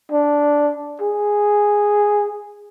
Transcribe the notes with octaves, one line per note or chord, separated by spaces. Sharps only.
D4
G#4